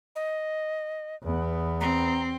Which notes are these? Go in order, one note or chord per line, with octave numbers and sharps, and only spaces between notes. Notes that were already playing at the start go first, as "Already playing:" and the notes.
D#5
E2 B3
C4 A#5